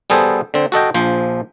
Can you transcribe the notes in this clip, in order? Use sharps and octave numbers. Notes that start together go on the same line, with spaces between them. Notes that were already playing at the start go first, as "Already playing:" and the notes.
G3 B3 G#4 A4 C5
D3 C4
F#4 A4 D#5 G5
A#1 F3 C5